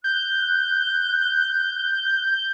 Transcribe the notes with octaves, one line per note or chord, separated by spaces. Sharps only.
F#6 G6